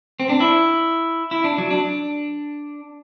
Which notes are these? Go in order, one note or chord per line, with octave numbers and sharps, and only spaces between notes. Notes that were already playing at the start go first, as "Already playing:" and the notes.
C4
D4
E4
E4
D4
F#3
D4